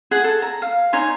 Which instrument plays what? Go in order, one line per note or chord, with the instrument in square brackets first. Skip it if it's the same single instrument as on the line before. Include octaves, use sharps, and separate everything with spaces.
[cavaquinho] G#4 F#5
A4
A#5
F5
D#4 C#5 G#5 C6